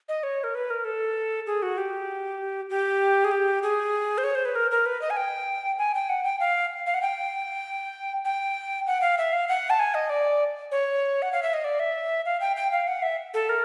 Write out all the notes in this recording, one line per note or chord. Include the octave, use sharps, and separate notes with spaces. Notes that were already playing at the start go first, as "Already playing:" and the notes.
D#5
C#5
A#4
B4
A#4
A4
G#4
F#4
G4
G4
G#4
G4
G#4
C5
C#5
C5
B4
A#4
A#4
B4
D#5
G#5
G5
G#5
G5
F#5
G5
F5
F5
F#5
G5
G5
F#5
F5
E5
F5
F#5
A5
G#5
D#5
D5
C#5
F#5
F5
E5
D#5
D5
E5
F5
G5
G5
F5
F#5
E5
A4
A#4